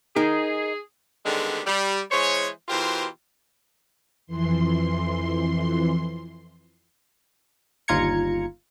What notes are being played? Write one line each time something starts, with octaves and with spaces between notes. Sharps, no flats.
D#4 G#4 A#4
D3 D#3 G3 G#3 B3 C4
G3
E3 G#3 C5 C#5
B2 E3 F4 G4 A#4 C5
F2 E3 C6
G1 D#2 F4 A#5 G#6 C#7